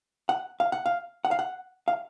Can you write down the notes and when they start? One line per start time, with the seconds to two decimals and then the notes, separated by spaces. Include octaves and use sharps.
0.29 F#5
0.60 F5
0.72 F#5
0.86 F5
1.25 F#5
1.31 F5
1.39 F#5
1.88 F5